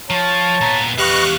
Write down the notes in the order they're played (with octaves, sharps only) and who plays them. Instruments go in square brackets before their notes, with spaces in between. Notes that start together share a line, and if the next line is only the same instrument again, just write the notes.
[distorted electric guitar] F3 [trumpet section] C#5 A5
[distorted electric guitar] A#2 B3 [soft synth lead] A#5
[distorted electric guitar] E2 F5 [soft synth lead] G4 [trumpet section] B4 D#5 [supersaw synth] C#6 F#6